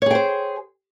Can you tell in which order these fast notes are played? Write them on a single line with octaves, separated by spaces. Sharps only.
C#5 G#4 G5 C5